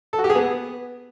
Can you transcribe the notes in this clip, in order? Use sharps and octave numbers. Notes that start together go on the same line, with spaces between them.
A4
F#4
G4
G#4
B3